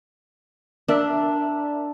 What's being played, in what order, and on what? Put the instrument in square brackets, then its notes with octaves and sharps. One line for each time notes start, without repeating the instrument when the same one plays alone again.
[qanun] D4 [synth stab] A#4 D5 E5